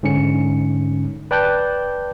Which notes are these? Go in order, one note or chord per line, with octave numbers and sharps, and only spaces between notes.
G#2 D3 C#4 C#7
B4 D5 G5 A5 F#6 G6